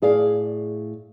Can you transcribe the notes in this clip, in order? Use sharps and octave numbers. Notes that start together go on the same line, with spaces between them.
A2 G#4 D5 F5